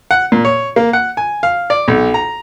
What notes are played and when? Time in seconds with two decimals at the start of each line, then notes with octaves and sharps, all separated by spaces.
0.11 F#5
0.32 A#2
0.45 C#5
0.76 A#3
0.93 F#5
1.17 G#5
1.43 F5
1.70 D5
1.88 B1
2.14 A#5